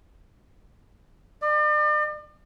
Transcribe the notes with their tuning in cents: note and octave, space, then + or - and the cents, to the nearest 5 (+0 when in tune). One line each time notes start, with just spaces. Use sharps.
D5 +40